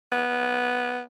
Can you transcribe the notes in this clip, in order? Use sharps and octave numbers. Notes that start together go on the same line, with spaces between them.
B3